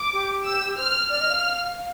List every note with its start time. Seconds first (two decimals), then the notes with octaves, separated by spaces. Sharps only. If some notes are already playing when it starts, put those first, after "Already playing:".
Already playing: D6
0.13 G4
0.45 E6
0.77 C5 F6
1.09 D5 F6
1.21 D#5
1.31 F5